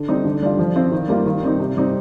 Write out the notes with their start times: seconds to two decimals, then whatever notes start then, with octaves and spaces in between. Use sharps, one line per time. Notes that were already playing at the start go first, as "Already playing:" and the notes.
Already playing: D3
0.08 G3 C4 D#4
0.25 D3
0.42 G3 D4 F4
0.59 F3
0.76 C4 F4
0.92 D#3
1.09 G3 A#3 F4
1.26 D#3
1.43 G3 C4 D#4
1.60 C3
1.77 G3 C4 D#4